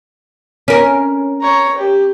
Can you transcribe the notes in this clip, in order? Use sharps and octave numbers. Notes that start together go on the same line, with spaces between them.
C#4 A#4
C#5 A#5
G4